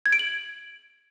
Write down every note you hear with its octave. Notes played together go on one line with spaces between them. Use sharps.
G#6
D7
F#7